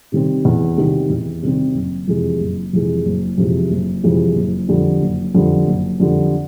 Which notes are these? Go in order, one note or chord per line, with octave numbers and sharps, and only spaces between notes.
C3 D#3 G3 C4
E2
C3 D#3 G3 C4
E2
C3 D#3 G3 C4
F#1
F2 C3 E3 G#3
F#1
F2 C3 E3 G#3
F#1
F2 C3 E3 G#3
F#1
F2 C3 E3 G#3
F#1
F2 D3 G3
F#1
F2 D3 G3
F#1
F2 D3 G3